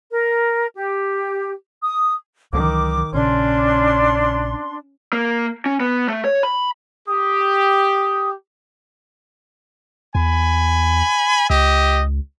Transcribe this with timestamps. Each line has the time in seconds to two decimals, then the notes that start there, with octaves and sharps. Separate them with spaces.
0.11 A#4
0.75 G4
1.82 D#6
2.53 C#2 D#3 E3 F#3 D6
3.13 A#1 A#2 C#3 C#4 D4 C6
5.13 A#3
5.66 C#4
5.80 B3
6.08 A3
6.24 C#5
6.43 B5
7.07 G4 D#6
10.15 E2 G#5 B5
11.50 C#2 G4 D#5